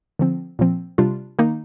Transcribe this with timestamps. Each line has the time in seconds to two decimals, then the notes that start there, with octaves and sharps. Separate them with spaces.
0.19 D3 F3 C4
0.59 A#2 F3 C4
0.98 C3 G3 D4 F4
1.39 D#3 A#3 D#4